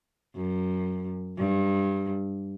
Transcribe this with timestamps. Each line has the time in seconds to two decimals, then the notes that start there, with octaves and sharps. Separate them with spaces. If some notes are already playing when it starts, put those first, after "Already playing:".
0.36 F#2
1.37 G2